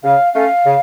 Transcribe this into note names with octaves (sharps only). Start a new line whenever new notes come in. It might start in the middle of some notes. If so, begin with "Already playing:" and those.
C#3 F5
A3 C#4 F5
C#3